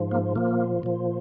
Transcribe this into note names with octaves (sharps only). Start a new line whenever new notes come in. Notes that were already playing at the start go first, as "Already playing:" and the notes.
Already playing: G#2 F3
A#3
A#2 F3 A#3
A#2 F3